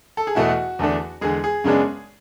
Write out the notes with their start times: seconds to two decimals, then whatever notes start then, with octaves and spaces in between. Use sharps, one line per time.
0.17 A4
0.27 G#4
0.35 E2 B2 A3 E4 F#4
0.79 E2 D3 A3 D4
1.21 E2 D3 G#3 G#4
1.44 G#4
1.64 F#2 C#3 G#3 B3 D4